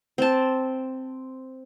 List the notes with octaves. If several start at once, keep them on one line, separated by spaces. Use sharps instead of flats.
C4 A5